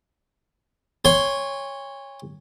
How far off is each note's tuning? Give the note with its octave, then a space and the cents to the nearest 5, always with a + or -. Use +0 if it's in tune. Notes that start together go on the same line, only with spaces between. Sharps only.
C#5 +0 G#5 -40 C6 +0